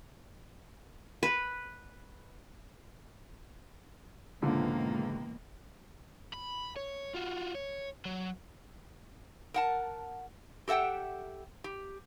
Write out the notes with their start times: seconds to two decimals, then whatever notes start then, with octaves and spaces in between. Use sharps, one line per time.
1.23 B4
4.42 C#2 G#2 B2 D3 E3 F3 A#3
6.34 B5
6.76 C#5
7.15 F4 F#4
7.55 C#5
8.05 F#3
9.54 A#4 F#5 A5
10.68 G4 A4 E5 F#5 G5
11.64 G4